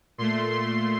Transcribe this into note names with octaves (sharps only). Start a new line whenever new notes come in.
A#2 A3 C6
C6